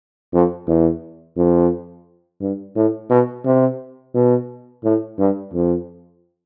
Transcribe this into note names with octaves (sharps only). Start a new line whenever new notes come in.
F2
E2
F2
G2
A2
B2
C3
B2
A2
G2
F2